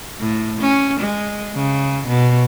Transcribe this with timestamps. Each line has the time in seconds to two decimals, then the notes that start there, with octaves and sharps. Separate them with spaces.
0.19 A2
0.61 C#4
1.00 G#3
1.55 C#3
2.07 B2